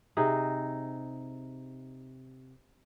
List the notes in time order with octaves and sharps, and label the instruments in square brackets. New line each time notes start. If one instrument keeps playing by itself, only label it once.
[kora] C3 D#4 G#4